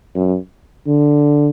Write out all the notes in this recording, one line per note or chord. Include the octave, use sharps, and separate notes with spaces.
F#2
D3